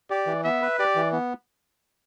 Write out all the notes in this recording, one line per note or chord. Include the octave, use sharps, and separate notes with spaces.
G4 D5
E3
B3 E5
B4
G4 D5
E3
B3